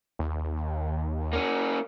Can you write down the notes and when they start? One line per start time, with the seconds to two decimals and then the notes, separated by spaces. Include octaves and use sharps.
0.19 D#2
1.33 A#3 C#4